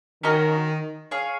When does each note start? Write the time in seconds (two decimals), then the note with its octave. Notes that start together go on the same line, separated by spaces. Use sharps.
0.23 D#3 C#4 F#4 A#4 D#5
1.11 G#4 C#5 F5